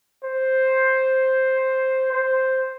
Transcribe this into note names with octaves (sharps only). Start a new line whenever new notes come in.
C5
C5